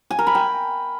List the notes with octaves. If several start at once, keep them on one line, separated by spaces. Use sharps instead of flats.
G#5
A#4
B5
G5